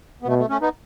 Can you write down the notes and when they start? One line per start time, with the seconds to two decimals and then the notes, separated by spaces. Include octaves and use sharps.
0.23 B3
0.27 B2 A3
0.39 A3
0.49 A3 C#4
0.61 B3 D#4